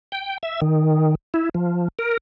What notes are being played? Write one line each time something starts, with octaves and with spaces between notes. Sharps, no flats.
G5
E5
D#3
E4
F3
A#4